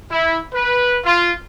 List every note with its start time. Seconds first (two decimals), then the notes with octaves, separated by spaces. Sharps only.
0.11 E4
0.53 B4
1.04 F4